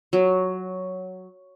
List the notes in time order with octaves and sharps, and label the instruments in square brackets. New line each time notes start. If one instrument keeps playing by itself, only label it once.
[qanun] F#3